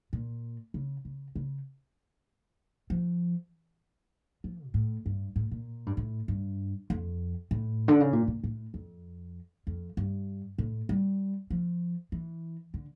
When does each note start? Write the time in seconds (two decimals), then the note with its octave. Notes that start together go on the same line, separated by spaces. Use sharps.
0.13 A#2
0.74 C#3
1.05 C#3
1.35 C#3
2.90 F3
4.44 F3
4.65 A#2
4.74 A2
5.06 G2
5.36 A2
5.51 A#2
5.86 G2
5.97 A2
6.28 G2
6.90 F2
7.51 A2
7.88 D3
8.00 C#3
8.13 A#2
8.28 A#2
8.44 A2
8.74 F2
9.67 F2
9.97 G2
10.58 A2
10.89 G3
11.50 F3
12.12 E3
12.74 D3